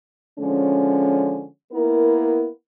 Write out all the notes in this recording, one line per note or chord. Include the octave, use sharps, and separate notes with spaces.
D3 F3 G#3 C#4
A#3 B3 E4 A#4